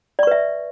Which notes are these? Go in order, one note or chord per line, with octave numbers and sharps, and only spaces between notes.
B4 D5 E5 C#6